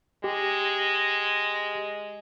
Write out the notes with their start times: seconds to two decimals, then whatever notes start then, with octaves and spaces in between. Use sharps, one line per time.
0.24 G#3 G4